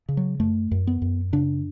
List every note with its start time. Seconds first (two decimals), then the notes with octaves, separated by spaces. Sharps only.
0.09 C#3
0.17 F#3
0.40 F#2 A3
0.71 F#2
0.87 B3
1.02 F#2
1.33 C#3 D4